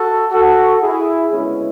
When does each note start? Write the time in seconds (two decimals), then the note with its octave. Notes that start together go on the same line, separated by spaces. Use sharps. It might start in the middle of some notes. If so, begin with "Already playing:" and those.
Already playing: F#4 A4
0.32 F#4 A4
0.82 E4 G#4
1.33 D2 C#3 G#3 B3 C#4 E4